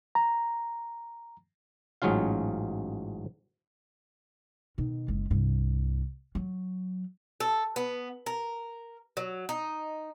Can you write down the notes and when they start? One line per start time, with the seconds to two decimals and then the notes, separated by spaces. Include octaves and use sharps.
0.15 A#5
2.02 A1 G#2 F#3 C#4 F4 F5
4.78 B2 D#3
5.08 F#1 G#3
5.30 C2 G2
6.35 F#3
7.40 A4
7.76 B3
8.26 A#4
9.17 F#3
9.49 D#4